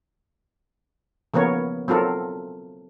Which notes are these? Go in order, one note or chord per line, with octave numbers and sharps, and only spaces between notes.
C#3 F3 A#3 B3 A#4 C#5
F#3 C4 F4 A4 A#4